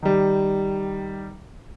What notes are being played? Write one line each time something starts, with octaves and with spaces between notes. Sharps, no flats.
D#3 G3